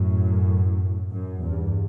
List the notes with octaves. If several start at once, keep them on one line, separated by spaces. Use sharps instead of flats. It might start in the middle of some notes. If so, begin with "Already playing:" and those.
Already playing: F#2 A2
F#2
E2 G2